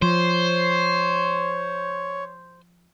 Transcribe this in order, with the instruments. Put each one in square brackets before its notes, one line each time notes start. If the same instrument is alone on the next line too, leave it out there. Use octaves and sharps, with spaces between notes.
[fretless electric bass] F3 [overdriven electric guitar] C5 [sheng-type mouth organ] C#5